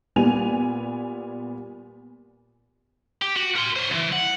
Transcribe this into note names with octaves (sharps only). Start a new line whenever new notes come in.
A#2 G3 B3 G#5 F7
G4
F#4
A#4 C6
C5 C#5
C#2 E3
F#5